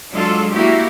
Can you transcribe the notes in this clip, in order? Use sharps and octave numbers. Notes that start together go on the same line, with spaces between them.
F#3 G#3 D4 F4 A4
A#3 E4 F#4 G4